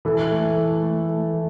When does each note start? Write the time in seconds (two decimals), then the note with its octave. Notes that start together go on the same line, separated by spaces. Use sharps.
0.05 E3 A4
0.31 A3
0.57 E3
0.82 A3
1.08 A3
1.34 E3